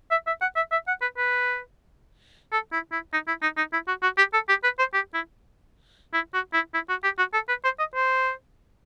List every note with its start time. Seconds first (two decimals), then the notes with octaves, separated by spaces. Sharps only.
0.11 E5
0.27 E5
0.41 F#5
0.56 E5
0.72 E5
0.88 F#5
1.02 B4
1.18 B4
2.52 A4
2.73 E4
2.92 E4
3.13 D#4
3.28 E4
3.42 D#4
3.57 D#4
3.73 E4
3.88 F#4
4.03 F#4
4.18 G4
4.34 A4
4.49 G4
4.64 B4
4.79 C5
4.94 G4
5.14 E4
6.14 E4
6.34 F#4
6.54 E4
6.74 E4
6.89 F#4
7.04 G4
7.18 F#4
7.34 A4
7.49 B4
7.64 C5
7.79 D#5
7.95 C5